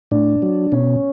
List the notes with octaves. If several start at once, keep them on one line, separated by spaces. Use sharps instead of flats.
A2 D4
F#3
B2 C#4